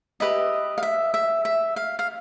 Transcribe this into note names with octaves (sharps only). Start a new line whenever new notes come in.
G4 B4 D#5 E5
F5
E5
E5
E5
F5
F5